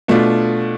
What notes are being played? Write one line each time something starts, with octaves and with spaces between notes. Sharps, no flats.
B2 A3 D4 F4